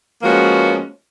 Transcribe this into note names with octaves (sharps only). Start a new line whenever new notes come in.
F3 G#3 A#3 B3 C#4 F#4